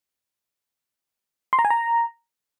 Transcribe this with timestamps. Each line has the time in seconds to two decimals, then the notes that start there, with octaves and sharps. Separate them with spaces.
1.53 C6
1.59 A#5
1.65 G#5
1.70 A#5